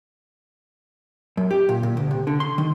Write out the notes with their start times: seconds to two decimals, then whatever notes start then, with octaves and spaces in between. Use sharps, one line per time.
1.37 F#2
1.51 G4
1.69 A#2
1.83 A#2
1.97 D2
2.11 C3
2.27 D3
2.40 C6
2.58 D#3